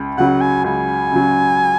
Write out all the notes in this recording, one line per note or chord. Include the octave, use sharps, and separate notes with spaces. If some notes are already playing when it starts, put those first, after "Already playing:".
Already playing: C#2
C#3 F#3 F#5
G#5
C#2 G#5
C#3 F#3